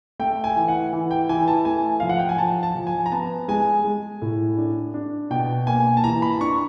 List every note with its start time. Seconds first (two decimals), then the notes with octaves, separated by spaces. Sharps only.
0.19 A3 G5
0.44 G#5
0.56 E3
0.68 F#5
0.93 E3
1.11 G5
1.29 E3 G#5
1.48 A5
1.65 A3 G#5
2.00 F3 F5
2.09 F#5
2.19 G5
2.29 G#5
2.38 F3 A5
2.63 A5
2.75 F3
2.87 G#5
3.06 A#5
3.12 B3 A5
3.48 G#3 G#5
3.85 G#3
4.22 A2
4.58 D4
4.94 D4
5.30 B2 G5
5.67 A#3 G#5
5.97 A5
6.04 E3 A#5
6.22 B5
6.41 D4 C#6